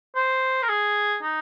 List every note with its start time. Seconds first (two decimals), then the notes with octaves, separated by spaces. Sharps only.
0.15 C5
0.63 A#4
0.69 G#4
1.22 D#4